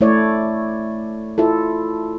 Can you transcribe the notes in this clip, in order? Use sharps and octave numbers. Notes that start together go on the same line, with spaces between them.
A3 E4 C#5 D5
E4 F4 A4